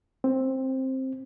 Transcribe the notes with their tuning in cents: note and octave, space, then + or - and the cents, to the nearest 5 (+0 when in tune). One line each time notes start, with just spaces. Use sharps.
C4 +10